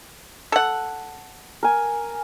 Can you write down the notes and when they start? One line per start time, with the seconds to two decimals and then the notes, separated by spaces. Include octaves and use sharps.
0.52 A4 F#5
1.63 A#4 G#5